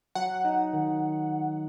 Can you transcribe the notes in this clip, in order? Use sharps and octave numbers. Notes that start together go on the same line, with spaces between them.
F#3 F#5
D#4
D#3